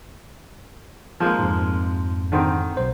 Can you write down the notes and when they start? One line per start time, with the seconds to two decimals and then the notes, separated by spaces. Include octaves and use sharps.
1.20 F3 G#3 A#3
1.39 F2 G#2
2.32 D3 D#3 C4
2.77 B1 C5